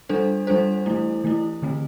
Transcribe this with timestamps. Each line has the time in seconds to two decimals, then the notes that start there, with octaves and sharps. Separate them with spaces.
0.09 G3 D4 A4 C5
0.47 G3 D4 A4 C5
0.86 E3 A3 E4
1.24 E3 A3 E4
1.62 D3 A3 C4